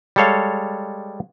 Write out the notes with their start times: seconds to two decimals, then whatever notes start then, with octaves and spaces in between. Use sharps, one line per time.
0.16 G3 G#3 A4 C#5 F5